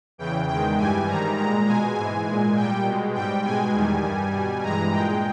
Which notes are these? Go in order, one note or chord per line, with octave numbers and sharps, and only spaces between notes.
E2 C#3 E3 G5
E2 D#3 G#3 G5
G2 E3 G3 G#5
G#2 D#3 G3 A#5
A#2 G#3 A#5
B2 G#3 G#5
G#2 E3 G#3 G#5
A#2 G#3
A#2 G3 G5
B2
G#3
G#2 G3 G5
B2 G#3 G#5
E2 D#3 G3
G2 G3
B2 G3
G2 E3 G#3 A#5
A#2 G#3 G5